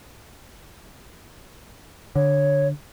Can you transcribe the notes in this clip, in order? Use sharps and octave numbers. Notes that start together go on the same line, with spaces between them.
D3 C#5